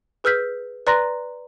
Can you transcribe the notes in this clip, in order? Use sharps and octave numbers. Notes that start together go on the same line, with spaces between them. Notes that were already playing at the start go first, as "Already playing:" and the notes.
G#4 B4 E6 F6 G6 B6
B4 D5 A#5 C6 F#6 A#6